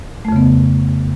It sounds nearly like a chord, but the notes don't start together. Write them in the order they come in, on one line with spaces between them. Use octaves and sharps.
A3 F2 C#3 B3